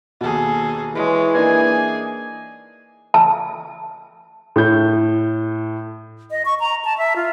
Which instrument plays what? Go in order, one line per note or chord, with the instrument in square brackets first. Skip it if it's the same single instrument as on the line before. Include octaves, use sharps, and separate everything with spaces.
[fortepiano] D#2 B2 [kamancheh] G#4 A4
[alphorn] E3 [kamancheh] G#3 C#5
[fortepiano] A#3 D4 D#4 [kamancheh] G#4 [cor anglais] G#5
[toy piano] A5
[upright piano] A2 G6
[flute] D#5
C#6
A#5
A5
E5
F4